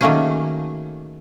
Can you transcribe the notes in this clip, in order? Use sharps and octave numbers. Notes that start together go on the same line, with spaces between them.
D#3 F#3 A3 A#3 C#4 G#4